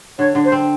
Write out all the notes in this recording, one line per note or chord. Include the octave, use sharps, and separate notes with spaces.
D3 C#5
D3
C5
C4